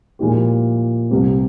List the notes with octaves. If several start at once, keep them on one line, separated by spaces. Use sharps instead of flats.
A#2 F3 G#3 E4 G4
C2 C3 G3 C4